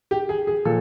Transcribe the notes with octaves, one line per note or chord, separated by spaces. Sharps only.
G4
G#4
G#4
A#2 F3 A4